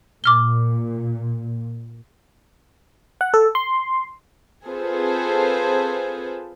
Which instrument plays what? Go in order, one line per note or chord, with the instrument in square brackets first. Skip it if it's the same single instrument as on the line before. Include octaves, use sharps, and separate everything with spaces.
[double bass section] A#2 [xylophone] D6 F6 G7
[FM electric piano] F#5
A4
C6
[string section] C4 F4 G#4 A4 B4 C5